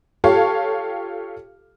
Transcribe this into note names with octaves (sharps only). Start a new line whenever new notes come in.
F4 G4 A4 C#5 F5